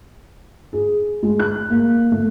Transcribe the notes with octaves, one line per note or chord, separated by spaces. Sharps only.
G#4
G#3
F#6
A#3
A3